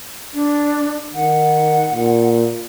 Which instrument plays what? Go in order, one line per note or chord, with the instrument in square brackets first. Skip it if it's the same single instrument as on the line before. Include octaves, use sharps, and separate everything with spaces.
[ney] D4
[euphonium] D#3 [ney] F#5
[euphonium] A#2